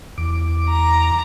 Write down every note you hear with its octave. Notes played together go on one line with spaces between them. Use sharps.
E2 D6
A#5